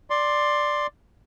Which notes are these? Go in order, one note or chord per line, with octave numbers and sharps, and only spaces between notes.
D5 C6